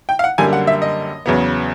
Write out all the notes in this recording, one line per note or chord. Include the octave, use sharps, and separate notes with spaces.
G5
F5
F#5
F#2 D3 G3 A#3 G#5
F#5
E5
D#5
E2 C#3 F#3 B3